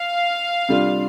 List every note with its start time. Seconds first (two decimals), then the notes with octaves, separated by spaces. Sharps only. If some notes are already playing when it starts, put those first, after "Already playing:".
Already playing: F5
0.69 C3 G3 D4 F4